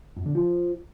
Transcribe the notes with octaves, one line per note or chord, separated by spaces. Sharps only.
F#2
D3
F3